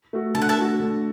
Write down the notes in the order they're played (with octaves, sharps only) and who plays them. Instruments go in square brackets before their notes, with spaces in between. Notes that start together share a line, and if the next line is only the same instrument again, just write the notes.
[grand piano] A3 F#4
[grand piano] D3 [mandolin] A5
[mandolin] F#5
E5 A5
[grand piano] A3 F#4
D3